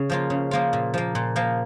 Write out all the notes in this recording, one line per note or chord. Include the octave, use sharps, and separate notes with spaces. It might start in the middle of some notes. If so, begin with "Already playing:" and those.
Already playing: C#3
F3 A#3 F4
C#3
F3 A#3 F4
A#2
F3 A#3
A#2
F3 A#3